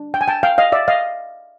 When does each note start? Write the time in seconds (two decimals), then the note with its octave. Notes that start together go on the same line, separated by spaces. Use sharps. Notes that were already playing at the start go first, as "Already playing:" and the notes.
Already playing: D4
0.14 G5
0.21 G#5
0.28 G5 A5
0.43 F5 G5
0.58 D#5 F5
0.72 D5 E5
0.88 D#5 F5